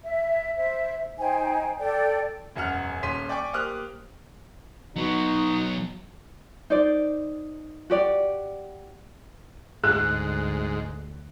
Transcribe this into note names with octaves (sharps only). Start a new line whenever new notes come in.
E5
C5 E5
D#4 C5 G5 G#5
A4 D5 G5
E1 F#2 F#5 F6
D#1 C#4 C6 B6 D#7
D5 G5 G#5 C#6 D6
A#3 G4 C5 D#6 F6 F#6
F#3 B3 D#4 F#4
D#4 C5 D5
F#4 G4 D5
D2 G#2 G#4 F#6